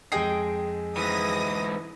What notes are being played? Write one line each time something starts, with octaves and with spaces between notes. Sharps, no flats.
F2 G#3 G#4 D#5 G5 C7
G#2 E3 D#6 A#6